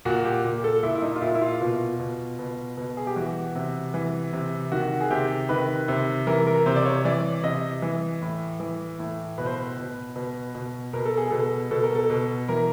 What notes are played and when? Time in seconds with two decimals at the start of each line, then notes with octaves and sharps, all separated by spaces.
0.05 A#2 F#4
0.25 G4
0.44 A#2
0.64 A4
0.83 A#2 E4
0.95 E4
1.02 D#4
1.16 F4
1.22 A#2 E4
1.35 E4
1.42 F4
1.61 B2 F4
2.00 B2
2.39 B2
2.77 B2
2.97 G#4
3.07 G4
3.16 E3 F#4
3.55 C3
3.94 E3
4.33 C3
4.72 D#3 F#4
5.01 G#4
5.11 C3 G4
5.49 D#3 B4
5.88 C3
6.27 E3 A#4
6.47 A#4
6.66 C3 C5
6.76 D5
6.86 C#5
7.05 E3 D5
7.43 C3 D#5
7.82 E3
8.22 A2
8.60 E3
8.99 A2
9.38 B2 B4
9.46 C5
9.53 B4
9.77 B2
10.16 B2
10.55 B2
10.93 B2 A#4
11.05 A4
11.17 G#4
11.30 B2 A4
11.71 B2 A4
11.83 A#4
11.95 A4
12.10 B2
12.48 E3 A#4